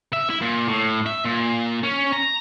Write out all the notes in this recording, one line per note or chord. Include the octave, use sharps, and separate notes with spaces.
E5
E4
A#2
A2
E5
A#2
C#4
A#5